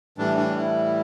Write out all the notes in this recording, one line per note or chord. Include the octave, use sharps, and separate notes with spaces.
A2 E3 G3 D4
D4
E4